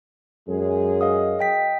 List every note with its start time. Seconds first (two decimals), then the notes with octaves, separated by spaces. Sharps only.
0.48 F#2 G#3 G#4
1.01 D#5 F5 D#6
1.39 D#5 G5 B6